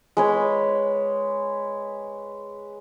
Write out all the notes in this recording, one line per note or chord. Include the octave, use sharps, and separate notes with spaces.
G#3 B4 C#5